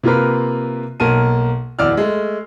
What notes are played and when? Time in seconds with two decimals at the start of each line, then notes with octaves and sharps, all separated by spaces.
0.03 C3 A#3 F4 A#4 B4
1.00 B1 A#3 A#4 A5 D#7
1.79 D1 E2 D5 E6 F6
1.97 G#3 A3